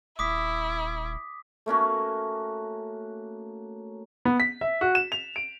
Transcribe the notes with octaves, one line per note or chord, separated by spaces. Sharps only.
D#1 E4 D6 D#6 B6
A3 A#3 C#4 F#4
B3
B6
E5
F#4
E7
F7
D7